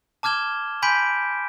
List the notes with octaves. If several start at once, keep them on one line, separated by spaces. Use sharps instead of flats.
A5 D6 F6 G#6 E7 G7
G#5 B5 C6 G6 B6 D7